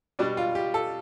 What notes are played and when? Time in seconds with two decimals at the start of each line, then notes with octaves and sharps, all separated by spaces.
0.19 B2 G3 D4
0.37 F4
0.55 G4
0.74 A4